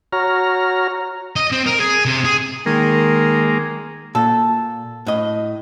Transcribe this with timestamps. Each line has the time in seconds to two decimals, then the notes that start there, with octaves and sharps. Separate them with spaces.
0.13 F#4 C#5 A#5 F6
1.36 D#5
1.52 C4
1.66 A#4
1.80 G#4
2.05 C3
2.25 G#4
2.66 D#3 G#3 A#3
4.15 A#2 A4
5.06 A2 D#5